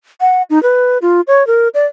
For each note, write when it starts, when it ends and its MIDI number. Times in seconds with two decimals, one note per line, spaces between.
0.21 0.42 78
0.50 0.62 63
0.63 0.98 71
1.02 1.21 65
1.27 1.46 73
1.47 1.68 70
1.74 1.86 74